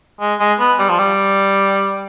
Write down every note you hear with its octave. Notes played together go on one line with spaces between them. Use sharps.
G#3
G#3
B3
G3
F3
G3